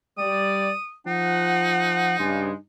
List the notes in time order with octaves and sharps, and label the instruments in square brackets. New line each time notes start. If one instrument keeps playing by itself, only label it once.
[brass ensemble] G3 D5 [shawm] D#6
[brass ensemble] F3 F#5 [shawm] D#4
[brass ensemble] G2 C#3 G#3